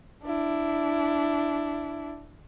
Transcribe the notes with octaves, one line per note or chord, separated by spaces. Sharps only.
D4 E4